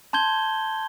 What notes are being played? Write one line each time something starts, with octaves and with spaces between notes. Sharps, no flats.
A5 C6 G6 G#6 G7